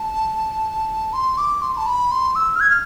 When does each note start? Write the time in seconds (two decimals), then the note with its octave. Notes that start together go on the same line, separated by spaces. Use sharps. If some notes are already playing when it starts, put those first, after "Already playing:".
Already playing: A5
1.13 C6
1.38 D6
1.62 C6
1.77 A5
1.86 B5
2.11 C6
2.35 E6
2.56 F6
2.60 G#6
2.70 F6